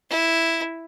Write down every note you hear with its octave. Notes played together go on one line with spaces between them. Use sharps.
E4